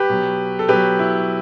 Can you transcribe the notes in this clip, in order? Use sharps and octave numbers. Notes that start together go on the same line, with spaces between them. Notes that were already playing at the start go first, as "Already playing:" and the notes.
Already playing: G4 B4
B2 F#3
A4
B2 F#3 G4 B4
E4